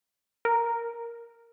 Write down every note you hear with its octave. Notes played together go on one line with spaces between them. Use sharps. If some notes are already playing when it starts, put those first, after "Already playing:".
A#4